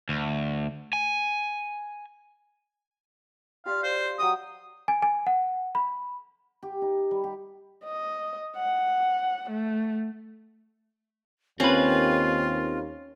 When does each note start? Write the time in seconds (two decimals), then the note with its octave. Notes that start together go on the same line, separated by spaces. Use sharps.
0.09 D2
0.93 G#5
3.66 F4 G4 D5 F5
3.83 C5
4.18 F#3 G5 D#6 E6
4.88 G#5
5.03 G#5
5.27 F#5
5.75 B5
6.63 G4
6.82 D#4
7.11 G3
7.24 G4
7.84 D#5
8.57 F#5
9.50 A3
11.60 D#2 C4 C#4 F4 B4